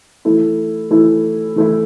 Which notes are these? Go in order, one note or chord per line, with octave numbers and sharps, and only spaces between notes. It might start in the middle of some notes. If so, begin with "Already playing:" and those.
E3 A3 E4
E3 A3 E4
E3 A3 E4